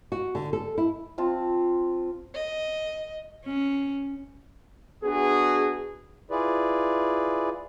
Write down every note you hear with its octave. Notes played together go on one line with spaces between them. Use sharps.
F#4
D3
A4
E4
C4 F4 A5
D#5
C#4
B3 D4 F#4 G#4
E4 F4 G#4 B4 D5